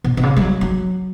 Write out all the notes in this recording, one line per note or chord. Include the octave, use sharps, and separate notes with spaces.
B2
B2
C#3
G#3
F#3
F#3